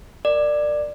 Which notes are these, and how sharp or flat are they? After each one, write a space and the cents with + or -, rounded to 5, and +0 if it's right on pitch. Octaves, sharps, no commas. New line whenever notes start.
A#4 +0 D5 +15